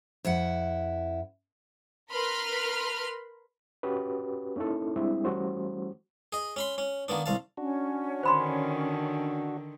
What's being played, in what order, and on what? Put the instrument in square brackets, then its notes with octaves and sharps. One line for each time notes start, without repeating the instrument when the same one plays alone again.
[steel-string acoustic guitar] F2 E4 F#5
[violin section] A#4 B4 B5 C6 F6
[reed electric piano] C#4 F#4 G4 B4
A#3 C#4 D#4 E4 A4
G3 G#3 C4 D4 E4
E3 G3 A3 C#4 F#4 C5
[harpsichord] G#4 D#5
C#4 B5 C6
C#4
D#3 A#3 B3 D4
C2 F5 A5
[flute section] C#4 [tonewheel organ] D4 F#4
[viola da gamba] D3 D#3 [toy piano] C5 B5 C6